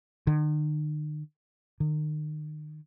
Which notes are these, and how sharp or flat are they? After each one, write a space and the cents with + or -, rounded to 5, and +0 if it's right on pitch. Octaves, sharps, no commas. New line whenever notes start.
D#3 -45
D#3 -35